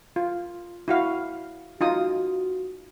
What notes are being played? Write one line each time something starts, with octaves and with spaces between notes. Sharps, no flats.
F4
E4 F#4 F5
D#4 F4 F#4 D#6